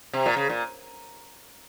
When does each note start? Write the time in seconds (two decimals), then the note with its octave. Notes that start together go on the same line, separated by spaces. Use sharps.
0.13 C3
0.26 A#2
0.37 C#3
0.49 A#2